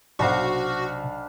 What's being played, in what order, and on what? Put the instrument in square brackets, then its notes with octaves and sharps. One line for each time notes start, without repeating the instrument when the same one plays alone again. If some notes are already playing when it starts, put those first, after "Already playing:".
[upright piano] B1 F5 [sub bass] C3 [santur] D4 C5 A5 [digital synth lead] F#4